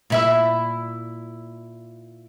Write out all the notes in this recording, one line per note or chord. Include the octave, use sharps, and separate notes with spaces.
A#2 E4 E5